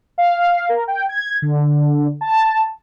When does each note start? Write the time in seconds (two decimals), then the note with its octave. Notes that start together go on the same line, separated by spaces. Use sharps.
0.18 F5
0.69 A#4
0.88 G5
1.09 G#6
1.42 D3
2.21 A5